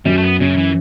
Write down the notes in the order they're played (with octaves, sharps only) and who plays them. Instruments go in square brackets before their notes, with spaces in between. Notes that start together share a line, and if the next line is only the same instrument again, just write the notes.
[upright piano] F#2 [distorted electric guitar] G3
[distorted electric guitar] A3
B3
[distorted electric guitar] C#3 [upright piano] C#4
[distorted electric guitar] E3